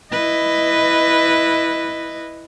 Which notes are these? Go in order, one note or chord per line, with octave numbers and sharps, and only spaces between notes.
E4 B4 D#5